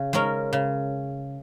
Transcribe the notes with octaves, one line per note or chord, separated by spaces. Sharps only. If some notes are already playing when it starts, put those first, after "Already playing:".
Already playing: C#3
G#3 C#4 A#4
C#3